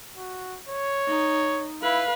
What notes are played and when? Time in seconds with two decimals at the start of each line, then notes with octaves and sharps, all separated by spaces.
0.15 F#4
0.69 C#5
1.07 D#4
1.82 E4 B4 F5